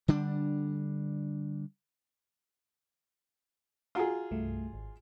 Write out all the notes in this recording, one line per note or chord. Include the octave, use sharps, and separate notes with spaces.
D3 G3 D4
F4 F#4 G#4 F#5 A#5
C2 G2 A3
G#1